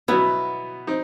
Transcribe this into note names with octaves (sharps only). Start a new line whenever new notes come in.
B2 F#3 B3 E4
C4 D#4